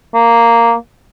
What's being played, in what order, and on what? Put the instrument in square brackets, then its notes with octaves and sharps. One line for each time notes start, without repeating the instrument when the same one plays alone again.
[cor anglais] A#3